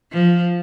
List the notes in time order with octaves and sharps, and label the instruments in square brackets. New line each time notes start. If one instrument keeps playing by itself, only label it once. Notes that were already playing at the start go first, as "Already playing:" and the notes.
[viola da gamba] F3